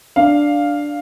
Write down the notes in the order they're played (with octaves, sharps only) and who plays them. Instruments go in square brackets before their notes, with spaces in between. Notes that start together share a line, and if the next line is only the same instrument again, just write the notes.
[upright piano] D4 F5